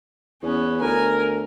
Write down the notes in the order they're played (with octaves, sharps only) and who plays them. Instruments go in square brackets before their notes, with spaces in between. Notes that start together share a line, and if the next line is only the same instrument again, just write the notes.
[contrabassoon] E2 [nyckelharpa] B3 C#4
[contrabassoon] D2 [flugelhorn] A#4 [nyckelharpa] G#5